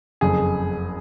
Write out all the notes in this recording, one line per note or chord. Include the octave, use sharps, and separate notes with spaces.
F#1 F2 C#3 G#4